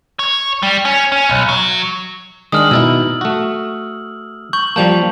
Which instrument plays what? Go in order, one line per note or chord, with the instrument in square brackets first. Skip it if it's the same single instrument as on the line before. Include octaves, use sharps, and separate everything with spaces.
[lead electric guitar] C#5
G3
C#4
C#4
B1
F#3
[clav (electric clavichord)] D#3 G#3 D4 [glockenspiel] D#6 F6 F#7
[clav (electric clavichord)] B2 D#4 E4 [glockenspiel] E6
[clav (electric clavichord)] A3 F#4
[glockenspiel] C#6 G6 F#7
[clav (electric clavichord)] F3 G3 A#3 [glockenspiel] A5 G6 F7